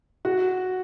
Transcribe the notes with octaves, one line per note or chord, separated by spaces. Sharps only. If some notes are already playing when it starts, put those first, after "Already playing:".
F#4